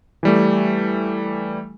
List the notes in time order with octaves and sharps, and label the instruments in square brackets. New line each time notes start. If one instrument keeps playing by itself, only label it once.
[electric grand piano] E3 G3 A3